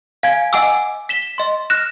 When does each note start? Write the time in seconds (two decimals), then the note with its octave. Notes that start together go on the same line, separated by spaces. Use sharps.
0.23 F5 G#5 G#6
0.53 D#5 F#5 G#5 D6 E6
1.09 B6 E7 G7
1.38 D#5 C6
1.70 F6 F#6 A#6 E7